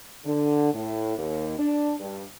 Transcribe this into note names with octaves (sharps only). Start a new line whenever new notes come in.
D3
A2
D#2
D4
G2